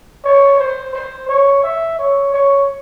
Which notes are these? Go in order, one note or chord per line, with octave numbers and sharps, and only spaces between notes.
C#5
C5
C5
C#5
E5
C#5
C#5